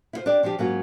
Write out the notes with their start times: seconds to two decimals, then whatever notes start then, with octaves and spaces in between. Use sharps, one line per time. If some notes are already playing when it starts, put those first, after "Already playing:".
0.13 E4 F4 C5
0.26 D4 G4 D5
0.43 F3 D4 F4 G4
0.58 G#2 F#3 A#3 C#4 F4 F#4